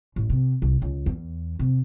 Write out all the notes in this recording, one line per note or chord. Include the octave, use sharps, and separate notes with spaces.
A1
C3
C2
C#2
E2
C3